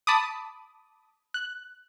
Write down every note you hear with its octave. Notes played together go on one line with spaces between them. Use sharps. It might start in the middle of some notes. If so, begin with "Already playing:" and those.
A5 B5 D6 D#6
F#6